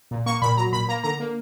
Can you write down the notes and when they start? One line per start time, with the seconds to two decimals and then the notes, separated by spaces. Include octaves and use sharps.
0.11 A#2
0.26 A#3 C#6
0.42 A#2 B5
0.57 F#3 A#5
0.72 A#2 B5
0.88 A#3 A#5
1.04 D3 A#5
1.20 A#3